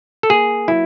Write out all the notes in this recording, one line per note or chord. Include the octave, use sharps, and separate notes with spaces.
A4
A#3 G#4
F#3 E4